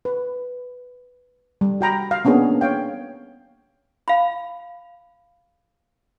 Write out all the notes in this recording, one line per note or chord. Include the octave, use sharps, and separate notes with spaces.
B4
G3
F#4 G5 A#5 B5
F5
A#3 B3 C#4 D4 G#4
C#5 F5 G5
F5 B5